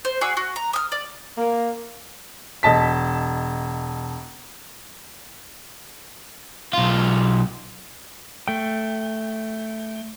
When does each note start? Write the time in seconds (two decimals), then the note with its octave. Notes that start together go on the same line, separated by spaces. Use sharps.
0.05 C5
0.21 F#4 G#4 D5 E6
0.37 F#4
0.56 A#5
0.73 D#6 F6
0.92 D5
1.38 A#3
2.63 E1 D#5 A5 B6
6.73 B1 F4
8.48 A3 G5